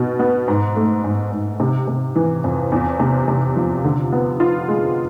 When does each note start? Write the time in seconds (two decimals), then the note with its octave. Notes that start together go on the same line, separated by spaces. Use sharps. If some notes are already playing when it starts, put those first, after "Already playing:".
Already playing: B2
0.19 B3
0.48 G#2
0.76 A3
1.04 G#2
1.32 G#2
1.60 C3
1.88 C3
2.16 E3
2.44 F2
2.72 E2
3.00 C3
3.28 C3
3.56 F3
3.84 D3
4.12 B3
4.40 F4
4.68 G#3